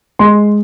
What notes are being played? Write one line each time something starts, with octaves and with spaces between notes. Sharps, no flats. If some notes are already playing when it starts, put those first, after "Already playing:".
G#3 C6